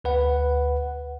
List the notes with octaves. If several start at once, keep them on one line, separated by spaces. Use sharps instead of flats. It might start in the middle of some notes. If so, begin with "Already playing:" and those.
D2 B4 F#5